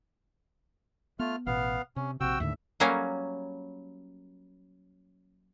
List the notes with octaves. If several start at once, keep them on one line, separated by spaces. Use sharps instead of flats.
A3 B3 F4 F6
A1 B2 B3 F5
C3 C#4
A#1 C3 F#4 G5 E6
D#2 A2 D3 E5
F#3 G3 A#3 C#4